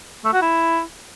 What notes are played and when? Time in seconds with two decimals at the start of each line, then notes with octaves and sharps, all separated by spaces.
0.25 A3
0.33 F#4
0.42 E4